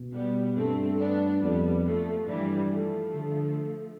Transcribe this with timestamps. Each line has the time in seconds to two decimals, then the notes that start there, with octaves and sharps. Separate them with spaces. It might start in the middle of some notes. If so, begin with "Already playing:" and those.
Already playing: B2
0.13 G3 B3
0.56 G2 A3 C4
1.00 B3 D4
1.42 F2 G3 B3
1.85 F3 A3
2.27 G2 E3 G3
2.70 F3 A3
3.14 D3